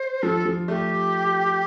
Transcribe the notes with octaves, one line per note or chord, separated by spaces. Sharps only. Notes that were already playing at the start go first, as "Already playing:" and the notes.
Already playing: C5
F3 A4
F3
A3 G4